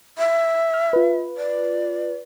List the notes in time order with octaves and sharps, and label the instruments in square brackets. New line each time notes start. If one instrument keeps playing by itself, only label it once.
[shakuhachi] E5
[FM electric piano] F6
F4 B4
[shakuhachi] D5